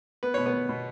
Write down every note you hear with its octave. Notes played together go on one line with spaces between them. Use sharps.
B3 B4
B2 C#5
B3 B4
B2
B2